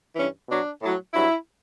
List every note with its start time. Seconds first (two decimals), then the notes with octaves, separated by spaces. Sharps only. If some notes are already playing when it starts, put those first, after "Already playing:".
0.15 G2 E3 C#4
0.48 B2 F#3 D4
0.81 A2 F#3
1.14 G2 F#3 E4